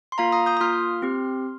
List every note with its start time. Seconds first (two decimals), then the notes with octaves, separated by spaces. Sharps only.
0.12 C6
0.18 A#3 F4 F5 A#5
0.32 A#5 D#6
0.46 D#6 G6
0.57 D#6
0.61 A#3 F4 C6 F6
1.02 C4 G4